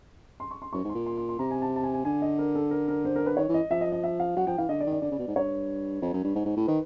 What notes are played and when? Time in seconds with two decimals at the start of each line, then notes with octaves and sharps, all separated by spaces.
0.40 C6
0.51 C#6
0.62 C6
0.73 F#2 C#6
0.84 G#2
0.89 C6
0.95 A#2
1.06 C6
1.17 C6
1.29 C6
1.39 C3 A#5
1.51 G#5
1.62 A5
1.76 A5
1.84 G#5
1.94 G#5
2.05 D3 G#5
2.22 D#5
2.39 A#4
2.55 A4
2.71 A#4
2.88 A#4
3.05 C5
3.16 A#4
3.26 B4
3.37 D#3 C#5
3.49 E3
3.54 D#5
3.71 F3 E5
3.81 D#5
3.92 D#5
4.04 E5
4.20 F5
4.36 F#3 F#5
4.47 F3 G5
4.58 E3 F5
4.69 D3 D#5
4.80 D5
4.86 D#3
4.92 D5
5.02 D3 D5
5.11 C#3
5.19 B2
5.27 G#2
5.36 G2 C#5
6.02 F2
6.13 F#2
6.24 G2
6.35 G#2
6.45 G#2
6.56 A2
6.67 D#3 B4